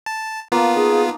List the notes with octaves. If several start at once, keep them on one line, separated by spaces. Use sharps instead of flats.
A5
A#3 B3 F4 A5
D#4 G#4